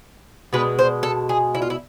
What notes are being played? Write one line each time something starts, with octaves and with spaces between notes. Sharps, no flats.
B2 G#3 B4
C5
A4
G#4
E4
F4
E4